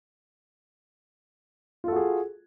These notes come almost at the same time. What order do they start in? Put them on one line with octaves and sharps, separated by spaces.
F4 A4 F#4 G#4